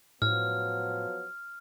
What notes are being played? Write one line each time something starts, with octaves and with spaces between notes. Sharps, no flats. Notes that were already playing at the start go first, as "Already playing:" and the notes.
A2 F3 F#3 B3 F6